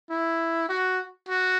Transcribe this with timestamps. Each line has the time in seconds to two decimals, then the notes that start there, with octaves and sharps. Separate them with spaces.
0.10 E4
0.69 F#4
1.29 F#4